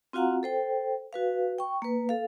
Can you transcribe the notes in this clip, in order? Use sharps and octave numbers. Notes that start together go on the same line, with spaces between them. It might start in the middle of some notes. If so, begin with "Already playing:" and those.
C4 F4 F#4 F5 F#5 A#5
A4 C5 G5
F#4 B4 F5
G5 C#6
A#3 B4
A4 F5